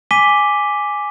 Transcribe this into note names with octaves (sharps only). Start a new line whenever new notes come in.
G#5 D6 B6 D#7 G7